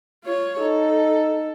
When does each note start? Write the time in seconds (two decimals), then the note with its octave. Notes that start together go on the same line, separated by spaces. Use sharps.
0.24 F4 C#5
0.60 D#4 A4